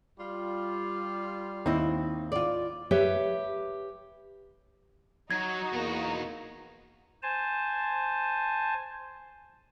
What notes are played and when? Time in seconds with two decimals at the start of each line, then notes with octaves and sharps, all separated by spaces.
0.19 G3 F4
1.66 D#2 C4 D#4 E4
2.32 F4 D5
2.91 G4 B4 C#5 E5
5.31 F#3 D#4 F#4 G#6
5.73 E2 B2 A#3 A#5
7.23 C5 G#5 A5